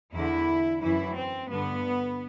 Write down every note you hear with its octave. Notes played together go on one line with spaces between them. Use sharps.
E2 D3 E4
F#2 E3 E4
C4
G2 D3 B3